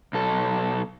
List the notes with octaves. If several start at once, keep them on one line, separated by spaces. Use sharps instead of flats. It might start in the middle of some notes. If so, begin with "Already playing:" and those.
B1 A4